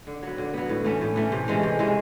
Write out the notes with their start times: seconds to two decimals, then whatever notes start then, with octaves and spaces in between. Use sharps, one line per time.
0.07 D3
0.22 F#3 B3
0.38 D3
0.54 F#3 B3
0.69 A2
0.84 E3 A3 C#4
1.01 A2
1.16 E3 A3 C#4
1.32 C3
1.48 E3 G#3 C#4
1.63 C3
1.79 E3 G#3 C#4